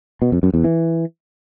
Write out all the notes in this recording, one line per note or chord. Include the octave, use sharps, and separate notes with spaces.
B2
F2
F#2
E2
E3